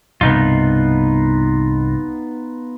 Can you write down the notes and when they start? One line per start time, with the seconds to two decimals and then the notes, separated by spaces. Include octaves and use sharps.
0.21 C2 G2 B2 B3 D#4 F4